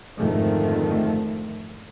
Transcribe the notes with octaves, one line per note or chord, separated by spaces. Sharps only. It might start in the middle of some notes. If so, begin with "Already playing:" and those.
F2 G#2 D3 D#3 F3 A3